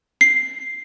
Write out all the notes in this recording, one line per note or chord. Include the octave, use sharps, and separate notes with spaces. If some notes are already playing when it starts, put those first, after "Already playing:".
C7